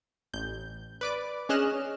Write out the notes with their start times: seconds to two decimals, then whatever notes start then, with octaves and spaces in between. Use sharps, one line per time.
0.33 A1 G6
1.01 B4 D5 D6
1.49 C#4 G#4 D#5 F6 F#6 E7